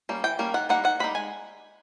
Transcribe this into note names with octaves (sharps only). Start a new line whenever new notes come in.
G3 A#3 C#4
E3 G5
G3 A#3 C#4
D#3 F#5
G3 A#3 D#4 F#5
D#3 F#5
G3 A#3 D#4 B5
G#3 G#5